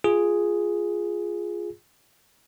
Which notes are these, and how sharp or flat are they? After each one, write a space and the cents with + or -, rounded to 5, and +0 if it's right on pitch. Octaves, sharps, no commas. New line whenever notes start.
F4 +0 G#4 +0